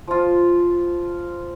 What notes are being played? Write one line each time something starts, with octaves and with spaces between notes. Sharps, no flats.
F3 F4